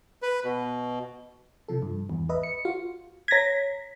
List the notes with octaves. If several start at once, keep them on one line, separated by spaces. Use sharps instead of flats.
B4
B2
C3 F3 A4
G2
E2 G#2
G1 B4 D#5 E5
C#7
F4 F#4 F5
C#5 G#6 A#6 B6